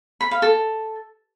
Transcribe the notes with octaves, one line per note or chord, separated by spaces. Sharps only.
B5
F5
A4